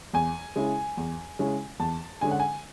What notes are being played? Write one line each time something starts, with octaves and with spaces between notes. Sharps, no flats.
E2 G#5
C#3 G#3 C#4 E4
E2
C#3 G#3 C#4 E4
E2 A5
D3 G#3 C#4 G#5
F#5
G#5